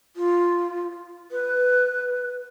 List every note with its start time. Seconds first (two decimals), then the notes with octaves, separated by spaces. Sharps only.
0.16 F4
1.32 B4